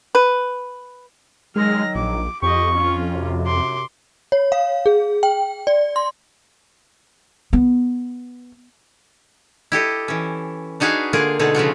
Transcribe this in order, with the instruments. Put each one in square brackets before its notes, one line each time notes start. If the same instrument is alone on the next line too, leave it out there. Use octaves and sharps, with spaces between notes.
[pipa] B4
[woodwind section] D#3 F#3 [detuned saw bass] G#3 [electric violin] F6 A#6
[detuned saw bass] A#1 [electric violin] D6
[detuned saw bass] F2 [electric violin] G4 D#5 [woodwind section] C#6
[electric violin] C#4 F4
[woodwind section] F#2 C3
[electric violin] C6 D6
[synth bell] C#5
F5
G#4
G5
D5
C6
[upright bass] B3
[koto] E4 G4 A4 D#5
E3 C#4
D4 D#4 F#4 G#4 B4 F5
D3 A#3 F4 G#4 A#4
B2 D3 A3 D#4 G#4
C#3 F3 F4 F#4